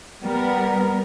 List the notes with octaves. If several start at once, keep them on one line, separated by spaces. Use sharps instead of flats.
G3 B3 A#4